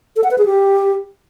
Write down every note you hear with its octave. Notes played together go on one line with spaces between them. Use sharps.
A4
F#5
B4
G#4
G4